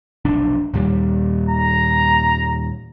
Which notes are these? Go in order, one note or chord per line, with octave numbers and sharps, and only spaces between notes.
F1 B1 D4
D#2 A#2 G3
A#5